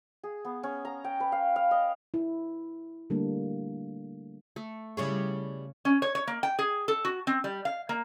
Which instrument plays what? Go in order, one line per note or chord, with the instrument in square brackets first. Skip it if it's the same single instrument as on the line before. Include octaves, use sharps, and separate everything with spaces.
[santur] G#4
B3
C#4
A#5
G5
B4
F5
F5
D#5
[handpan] E4
D3 G3 A3 A#3 D4
[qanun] A3
[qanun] C#3 C#5 C#6 [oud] G3 E4 G#4
[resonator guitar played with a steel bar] C#4
C#5
C#5
A#3
G5
G#4
A4
F#4
C4
G3
F5
A#3